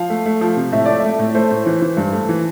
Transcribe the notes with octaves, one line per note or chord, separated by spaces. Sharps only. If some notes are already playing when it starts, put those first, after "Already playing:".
Already playing: F3 F5
A3
A3
F3
C3
A2 E5
A3 D5
A3 E5
A2
A3 C5
A2
E3
E3
G2
A3
E3